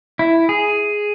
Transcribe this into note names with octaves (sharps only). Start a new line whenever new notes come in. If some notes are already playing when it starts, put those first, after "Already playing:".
E4
G#4